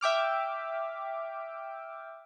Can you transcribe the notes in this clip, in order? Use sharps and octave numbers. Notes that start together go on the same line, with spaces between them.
E5 G5 D6 F6